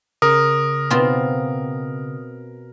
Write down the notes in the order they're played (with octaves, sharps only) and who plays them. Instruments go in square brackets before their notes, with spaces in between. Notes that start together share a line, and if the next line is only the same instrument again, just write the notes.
[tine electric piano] C#3 [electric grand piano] A#4 [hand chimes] D#6
[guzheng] B2 C4 F4